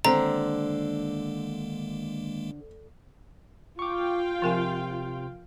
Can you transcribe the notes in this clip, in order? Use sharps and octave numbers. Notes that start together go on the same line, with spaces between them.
D3 D#3 G#3 A#3 C4 A#5
F4 F5 G5 C#6 D6
C3 F3 A#4 G#5 C6